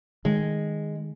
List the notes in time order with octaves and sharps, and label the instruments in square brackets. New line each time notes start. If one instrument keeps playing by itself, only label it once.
[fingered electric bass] D#3 [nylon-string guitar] G#3